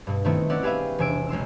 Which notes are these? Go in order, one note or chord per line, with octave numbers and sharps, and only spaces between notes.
G2 B2
D#3 A3 B3 C4 E4
C4 C#4 E4 D5 F#5
G4 G#4 B4 E5 F5
E1 C3 G#5 E6 D7
B1 G#3 C6 E6